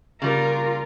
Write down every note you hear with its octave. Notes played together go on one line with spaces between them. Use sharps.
C#3 G3 A#3 F4 A#4